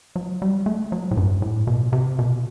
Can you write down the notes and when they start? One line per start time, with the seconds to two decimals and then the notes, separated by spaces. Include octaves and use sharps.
0.16 F#3
0.42 G3
0.66 A3
0.92 F#3
1.11 A2
1.17 G2
1.42 A2
1.67 B2
1.93 C3
2.19 B2